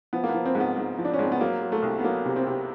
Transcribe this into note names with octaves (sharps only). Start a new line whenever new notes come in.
F3 B3
A#3
B3
F3
C4
G#2
B3
G#2
F3
D4
C#4
G#2 C4
B3
F#3 A#3
F#3
A3
C2
B3
F#3 A#3
C3
C4
C3